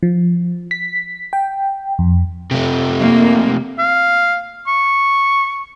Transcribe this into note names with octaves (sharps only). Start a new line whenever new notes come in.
F3
B6
G5
F2
C3 A3
A#3
F5
C#6